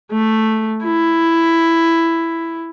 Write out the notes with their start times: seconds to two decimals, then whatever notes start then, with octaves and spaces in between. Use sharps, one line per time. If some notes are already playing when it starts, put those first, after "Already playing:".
0.12 A3
0.84 E4